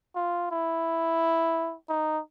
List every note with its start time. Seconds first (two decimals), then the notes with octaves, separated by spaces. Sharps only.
0.16 F4
0.51 E4
1.89 D#4